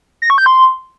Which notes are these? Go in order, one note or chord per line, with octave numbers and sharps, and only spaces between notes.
A#6
C#6
G6
C6